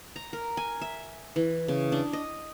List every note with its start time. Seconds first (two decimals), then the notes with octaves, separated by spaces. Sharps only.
0.16 A#5
0.33 A#4
0.57 G#5
0.81 E5
1.36 E3
1.68 C#3
1.92 D4
2.13 D#5